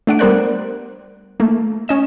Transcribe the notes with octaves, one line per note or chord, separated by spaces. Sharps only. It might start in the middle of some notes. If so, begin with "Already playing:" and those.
A3 D4 F#5 D7
G3 B3 A#4 C5 D5 F#6
A3 A#3
C#4 D#5 E7